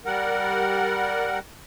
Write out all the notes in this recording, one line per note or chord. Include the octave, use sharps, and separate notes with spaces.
G3 A#4 F#5